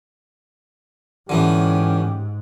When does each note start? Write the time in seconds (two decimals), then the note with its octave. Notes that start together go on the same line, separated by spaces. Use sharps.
1.29 G#2 D3 E3 B3 C#4 G4